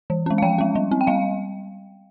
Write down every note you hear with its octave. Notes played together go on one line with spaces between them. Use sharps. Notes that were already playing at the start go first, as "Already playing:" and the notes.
E3
G#3 C#4
F5
F3 G5
G#3 C#4
G3
C4
G5
G3 F5